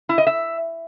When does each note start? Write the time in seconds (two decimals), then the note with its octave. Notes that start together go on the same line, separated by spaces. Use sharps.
0.09 E4
0.18 D#5
0.27 E5